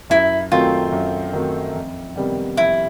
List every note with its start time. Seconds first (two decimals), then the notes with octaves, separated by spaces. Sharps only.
0.10 F#2 E4
0.52 D#3 F#3 A3 C4 F4
0.92 F#2
1.33 D#3 F#3 A3 C4
1.75 F2
2.16 C3 D#3 G3 B3
2.57 F2 E4